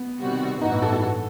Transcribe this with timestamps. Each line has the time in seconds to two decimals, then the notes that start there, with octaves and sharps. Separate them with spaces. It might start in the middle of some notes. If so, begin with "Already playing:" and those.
Already playing: B3
0.20 C3 D#3 G3 C4 F#4
0.61 A1 G2 E3 B3 D#4 F#4
0.72 D#4
0.82 A4
0.92 A4
1.03 A4